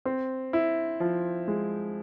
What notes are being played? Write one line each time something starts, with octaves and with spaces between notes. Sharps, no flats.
C4
E4
F3
G#3